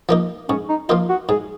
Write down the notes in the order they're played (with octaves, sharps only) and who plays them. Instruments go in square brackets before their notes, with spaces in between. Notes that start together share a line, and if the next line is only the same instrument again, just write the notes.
[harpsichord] F3 A#3 D#4
[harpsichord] G#2 [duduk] C#4
[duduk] D#4
[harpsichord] F3 A#3 D#4 [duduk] F4
[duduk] F#4
[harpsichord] G#2 [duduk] G#4